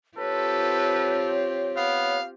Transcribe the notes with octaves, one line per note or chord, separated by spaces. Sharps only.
C4 F4 G4 A4 B4 C#5
B3 F5